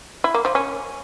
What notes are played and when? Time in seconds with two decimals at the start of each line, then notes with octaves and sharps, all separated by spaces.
0.24 E4
0.34 A#3
0.45 F3
0.55 C#4